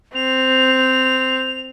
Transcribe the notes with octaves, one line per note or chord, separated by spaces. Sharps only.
C4 F7